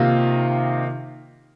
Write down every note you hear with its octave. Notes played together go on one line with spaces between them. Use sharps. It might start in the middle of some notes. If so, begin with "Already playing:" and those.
Already playing: C3 D#3 A#3 F4